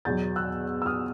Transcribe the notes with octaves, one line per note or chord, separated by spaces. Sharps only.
E2 B2 F#3 G6 A6
E6 F#6
E6
D#6 F6